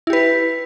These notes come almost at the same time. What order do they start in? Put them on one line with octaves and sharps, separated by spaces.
E4 G4 B4